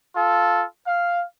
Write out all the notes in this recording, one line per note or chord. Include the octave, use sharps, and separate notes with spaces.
F4 A4
F5